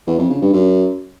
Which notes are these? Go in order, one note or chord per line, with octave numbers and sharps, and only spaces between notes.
E2
F2
C#3
G2
F#2